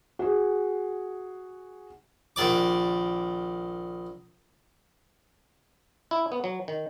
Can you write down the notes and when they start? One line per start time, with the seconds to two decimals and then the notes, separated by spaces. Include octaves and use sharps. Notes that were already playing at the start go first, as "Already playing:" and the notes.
0.19 F#4 G#4
2.36 A#1 D#3 D5 D6
6.11 E4
6.32 B3
6.44 F#3
6.68 D#3